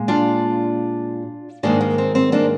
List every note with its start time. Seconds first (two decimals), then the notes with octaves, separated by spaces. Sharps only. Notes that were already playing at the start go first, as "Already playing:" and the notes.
Already playing: A#2 G#3
0.08 D4 F4
1.63 G#2 D#3 G#3 A#3 D4
1.81 A#3
1.98 C4
2.15 C4
2.32 A#3 D4